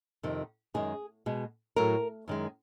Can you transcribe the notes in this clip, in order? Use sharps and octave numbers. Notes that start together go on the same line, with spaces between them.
F2 C3 D#3
F#2 D#3 G#3 G#4
B2 G#3
A2 F#3 A3 A#4
F#2 D#3 G#3